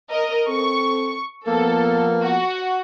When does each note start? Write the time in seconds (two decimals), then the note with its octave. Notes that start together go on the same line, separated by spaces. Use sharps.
0.10 A#4 D#5
0.48 C4 A4 C#6
1.47 F3 A#3 B3 A4
2.23 F#4